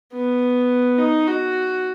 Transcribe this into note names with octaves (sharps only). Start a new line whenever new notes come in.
B3
D#4
F#4